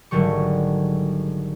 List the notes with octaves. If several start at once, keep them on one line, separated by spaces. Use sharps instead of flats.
G#1 D3 F#3 G3 C#6